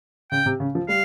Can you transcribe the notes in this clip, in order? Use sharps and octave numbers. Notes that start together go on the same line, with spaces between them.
C#3 G5
C3
C#3
F3
G3 F5